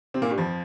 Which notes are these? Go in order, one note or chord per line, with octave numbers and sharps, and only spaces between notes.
C3 C4
A#2 A#3
G2 G3
F2 F3